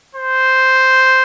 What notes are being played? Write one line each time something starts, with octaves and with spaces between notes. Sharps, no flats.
C5